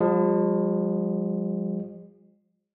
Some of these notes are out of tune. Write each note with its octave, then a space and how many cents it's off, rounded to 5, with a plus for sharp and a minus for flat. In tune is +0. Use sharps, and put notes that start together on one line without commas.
F3 +25 G#3 -45